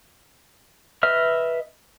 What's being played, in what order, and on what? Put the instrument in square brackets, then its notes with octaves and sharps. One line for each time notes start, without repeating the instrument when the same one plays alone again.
[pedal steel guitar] B4 D#5 E5 F6